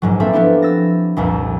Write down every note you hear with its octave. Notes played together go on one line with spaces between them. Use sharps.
A#1 G#2 F#3
A#3 C4 D4 A4 E5
F3 B3 E4 G4
E6 A6 A#6
F1 C2 F2 A#2